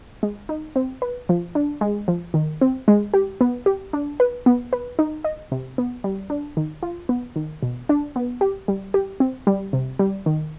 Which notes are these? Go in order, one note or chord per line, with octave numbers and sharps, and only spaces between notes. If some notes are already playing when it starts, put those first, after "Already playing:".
G#3
D#4
C4
B4
F3
D4
G#3
F3
D#3
C4
G#3
G4
B3
G4
D4
B4
B3
B4
D#4
D#5
C3
B3
G3
D4
D#3
F4
B3
D#3
B2
D4
B3
G4
G3
G4
C4
G3
C3
G3
D#3